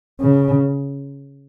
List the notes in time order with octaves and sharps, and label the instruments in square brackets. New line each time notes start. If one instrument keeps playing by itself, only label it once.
[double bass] C#3